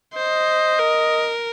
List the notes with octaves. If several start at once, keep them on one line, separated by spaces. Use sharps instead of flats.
C5 D#5
A#4